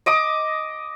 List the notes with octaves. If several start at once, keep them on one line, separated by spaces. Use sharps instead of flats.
D#5 D6 D#6